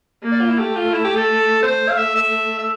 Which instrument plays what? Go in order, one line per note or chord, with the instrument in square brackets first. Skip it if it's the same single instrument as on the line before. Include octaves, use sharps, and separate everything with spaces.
[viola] A#3
[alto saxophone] D5
F4
E4
[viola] A3 [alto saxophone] G4
[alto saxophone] F4
E4
G4
A4
[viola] A3 [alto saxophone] C5
[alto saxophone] F5
E5
E5
E5